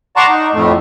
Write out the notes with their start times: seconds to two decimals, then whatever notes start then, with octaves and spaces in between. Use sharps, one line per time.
0.16 D5 F#5 A5 A#5 C6 C#6
0.29 D#4
0.53 F2 A2 A3